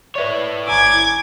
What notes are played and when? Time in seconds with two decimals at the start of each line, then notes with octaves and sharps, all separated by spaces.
0.16 E4 B4 C#5 D5
0.68 G1 G#5 A#5 D6 E6 G#6